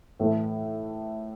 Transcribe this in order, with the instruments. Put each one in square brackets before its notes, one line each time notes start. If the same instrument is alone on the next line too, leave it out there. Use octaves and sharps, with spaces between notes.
[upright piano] A2 E3 A3